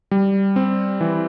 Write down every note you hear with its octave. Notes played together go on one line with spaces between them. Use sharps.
G3
C4
E3